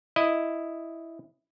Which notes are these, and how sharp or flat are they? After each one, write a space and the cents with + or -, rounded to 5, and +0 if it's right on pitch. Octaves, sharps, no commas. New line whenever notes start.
E4 +0 D#5 +0